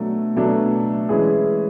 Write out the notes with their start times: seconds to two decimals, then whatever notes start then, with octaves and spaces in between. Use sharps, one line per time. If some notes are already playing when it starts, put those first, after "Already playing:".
Already playing: B2 F#3 A3 D4
0.36 B2 F#3 A3 D4
1.09 E3 G#3 C#4 E4 G#4